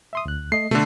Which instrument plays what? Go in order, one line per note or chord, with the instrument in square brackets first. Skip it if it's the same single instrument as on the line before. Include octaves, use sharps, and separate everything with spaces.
[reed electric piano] E5 C6 D#6
D2 F#6
[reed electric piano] A3 D#5 [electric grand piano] C7
[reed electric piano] B2 [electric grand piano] D3 A3